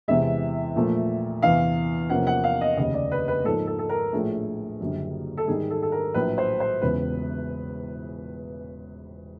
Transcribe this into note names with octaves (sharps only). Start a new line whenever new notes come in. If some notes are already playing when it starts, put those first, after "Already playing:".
E2 C3 E3 G#3 E5
A#2 F3 A3
E2 C3 E3 F5
E2 C3 F3 A#3 C#4 F#5
F#5
F5
D#5
F1 D#2 C#3 D#5
D5
B4
B4
G#2 F3 A#3 D#4 A4
A4
A4
A#4
A#1 A2 F3 A3 D4 G#4
F#1 F#2 D3 G3
A4
G#2 D#3 G3 G#4
A4
A4
A#4
A#1 A2 F#3 B4
C5
C5
E1 E2 C#3 B4